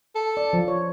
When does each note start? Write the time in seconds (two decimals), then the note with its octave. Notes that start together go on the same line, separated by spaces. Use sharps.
0.15 A4
0.37 D5
0.53 F3 F4
0.68 C#5